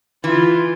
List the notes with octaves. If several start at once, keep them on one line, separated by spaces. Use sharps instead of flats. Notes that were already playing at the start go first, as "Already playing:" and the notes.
E3 F4